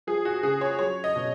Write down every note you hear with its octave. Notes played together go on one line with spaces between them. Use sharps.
F3 G#4
F#4
C#3 G#4
C#5
F#3 C#5
D#5
B2